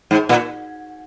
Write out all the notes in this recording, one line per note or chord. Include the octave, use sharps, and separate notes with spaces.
G#2
A#2